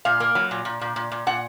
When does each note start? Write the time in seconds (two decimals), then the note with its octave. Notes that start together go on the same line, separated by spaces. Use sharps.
0.05 A#2 F5
0.20 A#3
0.35 F#3
0.51 A#2
0.65 A#2
0.81 A#2
0.96 A#2
1.12 A#2
1.27 A#2 F#5